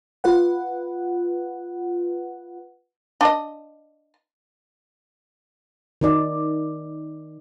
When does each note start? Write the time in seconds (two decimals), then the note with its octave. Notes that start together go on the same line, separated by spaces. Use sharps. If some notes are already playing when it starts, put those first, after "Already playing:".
0.24 F4 B4 F#5
3.21 D4 D#5
6.01 D#3 D#4 D5